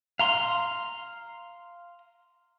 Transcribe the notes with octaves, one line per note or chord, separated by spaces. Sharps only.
F5 A#5 C6